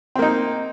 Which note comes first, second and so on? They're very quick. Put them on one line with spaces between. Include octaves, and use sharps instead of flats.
C4 A#3 D#4